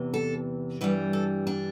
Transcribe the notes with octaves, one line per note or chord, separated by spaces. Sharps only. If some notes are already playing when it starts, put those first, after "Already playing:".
Already playing: E2 C3 E3
A4
G2 E3 G3 B4
A4
D4